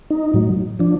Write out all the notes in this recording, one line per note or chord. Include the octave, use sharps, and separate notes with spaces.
D#4
A2 F#3
F3 D4